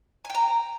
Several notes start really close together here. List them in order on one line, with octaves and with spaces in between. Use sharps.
G#5 G5 A#5